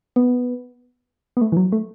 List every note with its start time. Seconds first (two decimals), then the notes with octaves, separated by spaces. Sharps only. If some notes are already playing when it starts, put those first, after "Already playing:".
0.16 B3
1.37 B3
1.41 A3
1.52 E3
1.57 F#3
1.72 A3